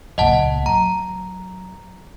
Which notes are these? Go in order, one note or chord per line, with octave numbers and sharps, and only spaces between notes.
C#2 A#2 D#5 F#5 A5
F#3 A#5